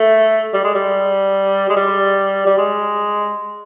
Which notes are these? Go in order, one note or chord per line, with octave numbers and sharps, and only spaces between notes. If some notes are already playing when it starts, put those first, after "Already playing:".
Already playing: A3
G3
G#3
G3
G#3
G3
G3
G#3